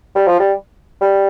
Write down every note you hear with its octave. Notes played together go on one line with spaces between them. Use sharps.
G3
F3
G3
G3